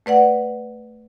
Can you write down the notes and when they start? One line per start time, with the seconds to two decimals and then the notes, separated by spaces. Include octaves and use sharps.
0.06 A3 B4 D5 F#5